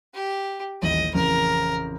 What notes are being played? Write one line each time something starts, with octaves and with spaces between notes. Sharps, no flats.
G4
D#1 A1 D#5 F#7
A1 F2 C#3 A#4